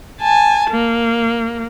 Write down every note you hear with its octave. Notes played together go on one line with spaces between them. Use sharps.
G#5 A5
A#3